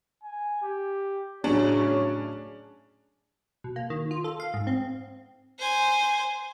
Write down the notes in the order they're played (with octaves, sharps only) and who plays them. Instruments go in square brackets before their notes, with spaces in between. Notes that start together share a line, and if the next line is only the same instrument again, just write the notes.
[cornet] G#5
G4
[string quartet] A2 C#3 F#3 [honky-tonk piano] C#4 D4 [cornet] C#5
[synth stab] B2
A#3
D#3
F4
A4
F5
G#2
C4
[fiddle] C5 G#5